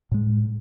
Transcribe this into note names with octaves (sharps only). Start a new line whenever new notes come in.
A2 G#3